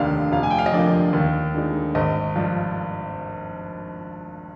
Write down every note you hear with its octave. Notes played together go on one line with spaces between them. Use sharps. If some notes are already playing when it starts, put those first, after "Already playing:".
Already playing: F1 D#2 D3 F5
F1 F5
G#5
G5
F5
D#5
F2 D3 F3 A#3 D5
D#2
D3 G#3 D#4
G#1 D#5
G2 F3